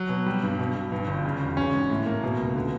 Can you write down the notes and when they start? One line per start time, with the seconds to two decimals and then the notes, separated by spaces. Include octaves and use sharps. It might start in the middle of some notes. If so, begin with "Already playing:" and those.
Already playing: F#3
0.09 B2
0.26 G3
0.43 G2
0.59 B2
0.75 B2
0.92 G2
1.08 G1
1.25 C#3
1.41 E1
1.57 C#4
1.74 G#2
1.90 A2
2.06 A#3
2.24 B2
2.40 C#2
2.55 D3